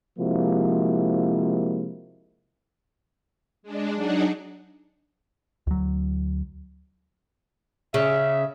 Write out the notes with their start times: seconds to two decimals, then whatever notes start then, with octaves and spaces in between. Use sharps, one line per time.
0.19 C3 F3 G#3 A#3 E4 F#4
3.63 G#3 D4
3.95 F#3 D4 D#4 F#4 G#4
5.67 D2 F#3
7.94 C#3 E5